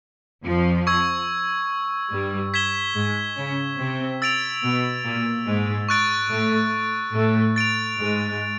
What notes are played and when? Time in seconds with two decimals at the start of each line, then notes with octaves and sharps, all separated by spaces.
0.44 F2 F3
0.87 C#6 E6 G#6
2.12 G2 G3
2.54 G#6 B6 E7 G7
2.96 G#2 G#3
3.37 C#3 C#4
3.79 C3 C4
4.22 E6 A6 D7 F7
4.63 B2 B3
5.05 A#2 A#3
5.46 G#2 G#3
5.89 C#6 F#6 A6 D7
6.30 A2 A3
7.14 A2 A3
7.56 A6 D7 F7
7.97 G#2 G#3